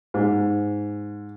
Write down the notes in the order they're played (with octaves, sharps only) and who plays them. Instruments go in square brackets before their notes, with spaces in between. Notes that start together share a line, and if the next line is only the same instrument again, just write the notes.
[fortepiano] G#2